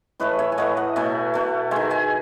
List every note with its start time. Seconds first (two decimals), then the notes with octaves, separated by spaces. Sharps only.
0.20 A2 E3 A3 B4 D#5
0.39 C#5 E5
0.52 G#5
0.58 A2 E3 A3 D#5 F#5
0.77 D#5 F#5
0.96 B2 A3 E5 G#5
1.34 B2 A3
1.71 D#3 G#3 E5 G#5
1.90 E5 G#5